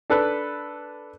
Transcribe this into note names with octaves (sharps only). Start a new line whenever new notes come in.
D4 A4 B4